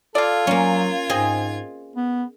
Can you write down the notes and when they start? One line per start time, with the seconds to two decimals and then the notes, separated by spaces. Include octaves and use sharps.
0.15 F4 A4 D5 F5 G#6
0.47 F#3 A#3 C#4
1.10 G#2 C4 G#4 D#5
1.96 B3